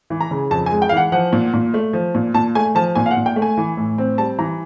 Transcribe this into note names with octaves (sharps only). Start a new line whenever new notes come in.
E3
A#5
C#3
F2 A5
G#5
G#3
G5
F5
E3 F#5
F3 F#5
A#2
A#2
A3
F3
A#2
A#2 A5
A3 G#5
F3 A5
A#2 G#5
F5
F#5
A#2
G5
A3
G#5
E3
A2
C4
G3 A5
E3 A#5